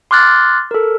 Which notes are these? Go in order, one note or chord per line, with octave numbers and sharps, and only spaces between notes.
C6 D6 F6 F#6 A6
A4 A#4